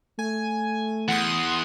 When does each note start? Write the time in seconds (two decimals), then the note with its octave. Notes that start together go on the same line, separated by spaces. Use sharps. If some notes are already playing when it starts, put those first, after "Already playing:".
0.19 A3 G#5
1.08 E2 F#5 C6 D#6